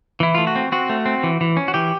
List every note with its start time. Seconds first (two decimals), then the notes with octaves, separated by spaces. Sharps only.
0.20 E3 E4
0.35 A3 F4
0.47 F#4
0.56 C4
0.72 C4 F#4
0.89 A3
1.06 C4
1.23 E3
1.41 E3
1.57 C#4
1.68 F#4
1.74 E3 G4